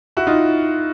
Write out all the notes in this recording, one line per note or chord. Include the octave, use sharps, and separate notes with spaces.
E4 F#4
D#4 F4